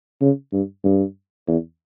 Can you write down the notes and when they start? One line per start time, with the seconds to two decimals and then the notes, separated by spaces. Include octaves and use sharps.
0.21 C#3
0.53 G2
0.84 G2
1.48 E2